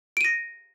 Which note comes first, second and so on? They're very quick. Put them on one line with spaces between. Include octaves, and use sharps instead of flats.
D7 D#7 A#6